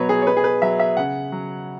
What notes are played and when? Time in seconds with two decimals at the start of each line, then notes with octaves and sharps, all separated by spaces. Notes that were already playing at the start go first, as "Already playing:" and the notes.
Already playing: B2 F#3 B4 C#5
0.09 G#4
0.22 C#5
0.27 B2 B4
0.37 G#4
0.44 B4
0.62 F#3 E5
0.80 E5
0.97 C#3 F#5
1.32 F#3